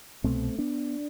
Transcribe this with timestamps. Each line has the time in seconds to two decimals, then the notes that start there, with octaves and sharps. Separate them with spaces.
0.24 C2 B2 A3 C4
0.58 B3 D4